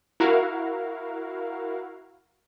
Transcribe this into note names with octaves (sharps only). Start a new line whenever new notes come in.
E4 F#4 A#4 F5